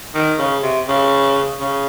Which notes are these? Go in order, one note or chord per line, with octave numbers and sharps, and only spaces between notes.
D#3
C#3
C3
C#3
C#3